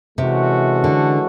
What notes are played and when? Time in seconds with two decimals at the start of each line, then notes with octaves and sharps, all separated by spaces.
0.18 C3 E3 G#3 C#4 F#4 A4
0.84 D3